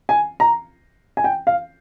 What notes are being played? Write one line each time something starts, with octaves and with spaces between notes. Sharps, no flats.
G#5
A#5
G#5
G5
F5